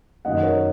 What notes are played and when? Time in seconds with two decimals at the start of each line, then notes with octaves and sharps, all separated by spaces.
0.25 F#2 D#3 F#3 D#5 F#5
0.43 A#4 C#5